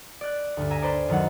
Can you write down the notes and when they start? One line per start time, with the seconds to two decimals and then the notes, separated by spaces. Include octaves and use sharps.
0.21 D5 F#6
0.57 D2 G2
0.71 E5 G#5 A#5
0.82 D4 B4 C5 D5
1.08 F#2 D#3 F#3 F#5